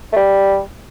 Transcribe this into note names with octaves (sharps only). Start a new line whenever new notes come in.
A3
G3